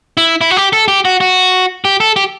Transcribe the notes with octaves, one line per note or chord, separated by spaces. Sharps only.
E4
E4
F#4
G4
A4
G4
F#4
F#4
G4
A4
G4